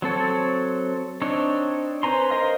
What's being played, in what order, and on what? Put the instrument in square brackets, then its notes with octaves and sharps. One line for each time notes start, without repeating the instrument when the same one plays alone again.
[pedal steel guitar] F#3 C4 A4 C#5
C4 D4 D#4 C#5
B4 C5 G#5 A#5 C6
A#4 C5 D#5 F5